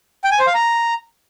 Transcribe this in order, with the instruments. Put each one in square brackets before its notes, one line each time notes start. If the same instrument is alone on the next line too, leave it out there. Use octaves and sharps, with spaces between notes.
[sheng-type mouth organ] G5
G#5
C5
F5
A#5